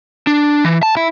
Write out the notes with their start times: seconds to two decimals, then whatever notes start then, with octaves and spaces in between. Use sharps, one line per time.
0.27 D4
0.65 E3
0.83 A5
0.97 E4